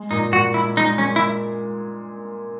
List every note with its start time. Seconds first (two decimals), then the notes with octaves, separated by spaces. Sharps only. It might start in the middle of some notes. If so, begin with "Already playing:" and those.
Already playing: G#3
0.11 A#2 D#4
0.32 A#2 F#4
0.54 G#3 E4
0.77 G#3 D#4
0.98 G#3 C#4
1.16 E4